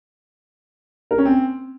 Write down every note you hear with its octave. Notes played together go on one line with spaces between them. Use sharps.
A#4
C#4
C4